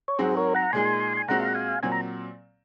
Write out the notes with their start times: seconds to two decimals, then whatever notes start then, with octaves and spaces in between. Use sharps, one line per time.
0.08 C#5
0.19 G#2 F#3 C4 F#4 G#4 C5
0.37 A#4 C#5
0.55 F#5 A#5
0.73 A#2 G#3 D#4 G#4 G#5 C6
1.17 G#5
1.28 A#2 G#3 C4 F#4 F#5 A#5
1.40 F5
1.48 F#5
1.55 F5 G#5
1.83 A#2 F#3 C4 G#5
1.92 A#5